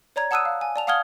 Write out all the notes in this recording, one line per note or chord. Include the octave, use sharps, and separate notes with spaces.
C#5 D5 A#5 G#6
F#5 A5 D#6 E6 F#6 D#7
F5
G#5
D5 A5 F7
F5 F#5 D#6 F6 G#6 G7